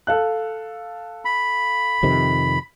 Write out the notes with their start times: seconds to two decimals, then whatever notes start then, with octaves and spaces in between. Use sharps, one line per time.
0.07 A4 F5 F#6
1.25 B5
2.03 F2 C3 D#3